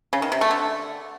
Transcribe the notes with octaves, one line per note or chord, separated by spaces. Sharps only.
C#3
D#3
C3
A3
D3